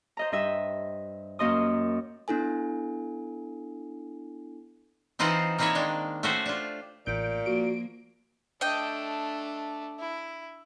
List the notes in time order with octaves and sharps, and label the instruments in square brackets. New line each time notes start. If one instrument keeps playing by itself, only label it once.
[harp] C5 D#5 A#5
G2 D#5 E5
F#2 A#3 D#5 C6 D#6
[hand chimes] B3 D4 E4 A4 G#5
[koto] E3 C4 D#4 F4 C5 F#5
A#3 C4 D#4 E4 A4 C#5
D#3 G#3 D4
A3 C#4 F#4 G4 C5
D4 F4
[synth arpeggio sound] A1 G6 D7 [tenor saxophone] A#2
[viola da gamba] F3 A#3 [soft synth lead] F#4 [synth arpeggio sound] D7
[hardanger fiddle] A3 D4 [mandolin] D#5 G5
[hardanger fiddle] E4